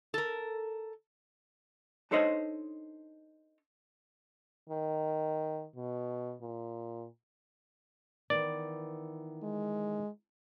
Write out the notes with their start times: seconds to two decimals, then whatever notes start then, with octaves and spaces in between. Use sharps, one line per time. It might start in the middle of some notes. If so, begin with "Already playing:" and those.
0.14 A4 A#4
2.11 D4 D#4 A4 C5 C#5 D#5
4.70 D#3
5.76 B2
6.41 A#2
8.30 D#3 E3 B3 D5
9.43 G#3